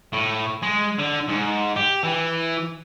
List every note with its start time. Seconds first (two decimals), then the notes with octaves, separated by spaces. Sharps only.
0.13 A2
0.62 G#3
0.98 D3
1.29 G#2
1.76 G4
2.04 E3